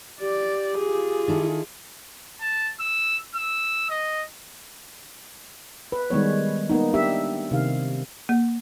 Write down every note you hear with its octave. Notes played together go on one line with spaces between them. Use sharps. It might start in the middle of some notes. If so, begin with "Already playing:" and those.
G4 D5
F4 G#4
D#3 E4 A4
A5
E6
E6
D#5
B4
D#3 G3 G#3 B3 C#5
A#3 B3 D#4
D4 G4 E5
C3 D#3 F5
A#3